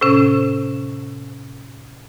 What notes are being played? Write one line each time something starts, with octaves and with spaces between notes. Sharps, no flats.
A2 C3 C#4